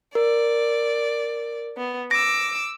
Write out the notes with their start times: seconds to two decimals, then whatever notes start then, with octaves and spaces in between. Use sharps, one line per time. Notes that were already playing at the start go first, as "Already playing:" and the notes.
0.15 A#4 D5
1.77 B3
2.11 D6 E6 A#6